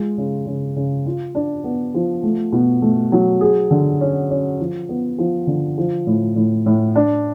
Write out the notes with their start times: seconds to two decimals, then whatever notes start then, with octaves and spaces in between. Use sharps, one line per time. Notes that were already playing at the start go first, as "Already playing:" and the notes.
Already playing: G#3 F4
0.18 C#3
0.46 C#3
0.76 C#3
1.06 F4
1.35 D4
1.64 B3
1.94 F3
2.23 A3
2.52 B2
2.82 A3
3.12 F#3
3.41 G#4
3.71 D3
4.01 C#4
4.30 C#4
4.60 F3
4.89 B3
5.18 F3
5.47 D3
5.78 F3
6.07 A2
6.36 A2
6.66 A2
6.96 D4